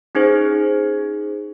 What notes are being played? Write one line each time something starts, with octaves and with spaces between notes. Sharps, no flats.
C#4 D#4 G#4 C5